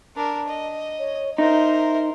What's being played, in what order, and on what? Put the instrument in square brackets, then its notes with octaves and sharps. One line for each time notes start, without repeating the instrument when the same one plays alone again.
[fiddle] D4 A#4
D#5
[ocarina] C#5
[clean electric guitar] D#4 [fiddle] A#4 C5 [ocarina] E5